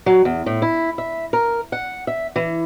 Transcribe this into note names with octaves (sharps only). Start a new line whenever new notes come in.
F#3
E2
A2
E4
E5
A#4
F#5
E5
E3